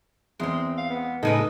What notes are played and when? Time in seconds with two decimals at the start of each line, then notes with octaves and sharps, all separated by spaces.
0.40 E2 G#3 C4
0.78 F5
0.90 B3
1.23 A2 C#3 G#3 D#4 A4 B4 D#5